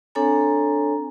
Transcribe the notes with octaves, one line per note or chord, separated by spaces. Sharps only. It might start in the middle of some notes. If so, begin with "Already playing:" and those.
C4 D4 A4 C#5 G#5 A#5